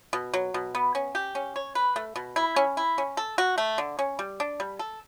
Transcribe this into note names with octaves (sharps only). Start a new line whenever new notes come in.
B2
F#3
B2
B3
C#4
G4
C#4
C#5
B4
A3
B2
E4
C#4
E4
C#4
A4
F#4
A3
D3
C#4
G3
D4
G3
A4